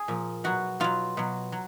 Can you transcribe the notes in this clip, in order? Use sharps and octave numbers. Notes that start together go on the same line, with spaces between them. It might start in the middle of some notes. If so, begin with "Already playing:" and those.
Already playing: G#4
A#2 F3
B2 F#3 F#4
B2 F#3 F4
B2 F#3
F#3